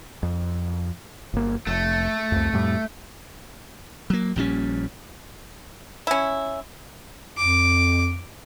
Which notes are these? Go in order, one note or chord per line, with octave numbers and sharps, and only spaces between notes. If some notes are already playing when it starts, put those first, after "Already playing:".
F2
G1 A#3
F1 A3
C2 F2
F2 A2 G3
F#3 A#3
A#1 A#2 G3 C#4
C#4 E4
F2 D6